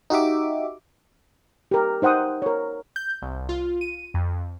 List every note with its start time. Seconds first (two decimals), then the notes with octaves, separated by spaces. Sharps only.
0.10 D#4 F#4 G4 E5 D6
1.71 G4 A#4
2.02 D#4 C5 F#5 G5 D#6
2.42 A#4 C#5
2.96 G6
3.22 C2
3.49 F4
3.81 D#7
4.14 F2